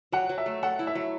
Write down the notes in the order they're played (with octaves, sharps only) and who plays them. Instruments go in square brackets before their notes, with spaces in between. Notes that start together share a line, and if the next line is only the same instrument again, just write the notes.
[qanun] F#3 [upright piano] F#5
[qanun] F#3
[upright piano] E5
[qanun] A3
[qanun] A4 [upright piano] F#5
[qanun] E4
[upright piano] E5
[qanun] F#3